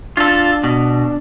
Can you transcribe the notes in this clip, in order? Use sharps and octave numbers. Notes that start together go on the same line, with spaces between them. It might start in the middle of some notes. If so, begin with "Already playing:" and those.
D4 F4 A4
B2